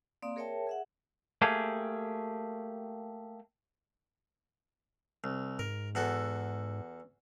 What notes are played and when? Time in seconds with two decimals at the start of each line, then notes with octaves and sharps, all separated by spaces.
0.22 A#3 C4 D5 F5 D#6
0.36 G#4 A#4 C#5 E5 G5 A5
0.67 G#4 E5 F#5
1.42 A3 A#3 G4 G#4
5.24 C2
5.59 G#2 A#4
5.95 E2 F#4 A4